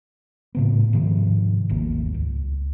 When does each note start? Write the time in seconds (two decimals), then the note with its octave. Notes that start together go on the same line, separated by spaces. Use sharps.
0.55 A2 C#3 B3
0.93 G#2 C3 D#3 F3
1.69 D#1 G#1 A#3
2.14 C#2